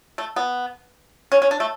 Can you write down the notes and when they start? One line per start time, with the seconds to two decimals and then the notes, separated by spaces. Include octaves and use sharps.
0.18 A3
0.36 B3
1.32 C#4
1.42 C#4
1.51 D4
1.60 A3